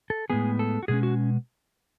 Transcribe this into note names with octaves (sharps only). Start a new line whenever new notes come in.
A4
A2 G#3 B3 G#4
A4
F#4
B2 G#3 C#4 G#4
F#4